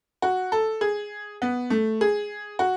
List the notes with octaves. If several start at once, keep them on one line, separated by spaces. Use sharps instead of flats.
F#4
A4
G#4
B3
A3
G#4
F#4